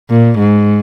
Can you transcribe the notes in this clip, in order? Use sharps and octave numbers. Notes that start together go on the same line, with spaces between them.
A#2
G#2